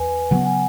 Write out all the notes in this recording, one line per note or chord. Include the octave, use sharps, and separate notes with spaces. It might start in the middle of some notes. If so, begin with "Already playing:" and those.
Already playing: E2 B4 G#5
C#3 F#3 B3 F#5
G#5